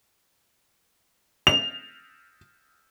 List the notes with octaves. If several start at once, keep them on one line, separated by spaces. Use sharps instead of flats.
F7